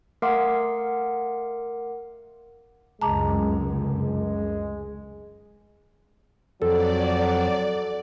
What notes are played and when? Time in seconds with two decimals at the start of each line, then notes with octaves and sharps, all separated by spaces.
0.22 A3 A#4 F5 F#5 C6 D6
3.02 F1 C#2 F#2 G#3 A5 A#5 D6
3.99 G#3
6.62 F2 F#3 A4 D5